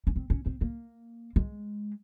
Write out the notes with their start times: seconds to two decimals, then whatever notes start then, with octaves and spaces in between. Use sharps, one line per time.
0.07 C#4
0.16 C4
0.30 C#4
0.46 C4
0.61 A#3
1.36 G#3